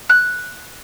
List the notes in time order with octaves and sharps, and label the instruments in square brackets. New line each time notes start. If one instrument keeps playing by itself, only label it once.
[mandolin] F#6